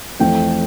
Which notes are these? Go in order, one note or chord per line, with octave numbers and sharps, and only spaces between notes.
F2 E3 A3 C4 G5